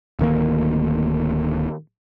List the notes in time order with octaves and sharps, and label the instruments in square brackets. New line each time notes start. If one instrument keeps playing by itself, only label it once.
[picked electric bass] D1 D2 D#3 A#3